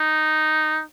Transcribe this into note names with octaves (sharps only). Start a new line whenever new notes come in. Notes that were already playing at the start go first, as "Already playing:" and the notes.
Already playing: D#4